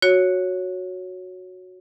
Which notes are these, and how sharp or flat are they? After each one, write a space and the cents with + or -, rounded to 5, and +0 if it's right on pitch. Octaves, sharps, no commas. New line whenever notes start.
F#4 -10 C#5 +0